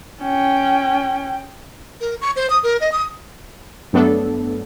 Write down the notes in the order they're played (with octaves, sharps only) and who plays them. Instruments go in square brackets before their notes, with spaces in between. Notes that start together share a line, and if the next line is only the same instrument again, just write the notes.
[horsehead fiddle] C#4 G5
[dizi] A#4
C#6
C5
D#6
A#4
D#5
D#6
[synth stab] G2 F#3 A3 B3 D4 A4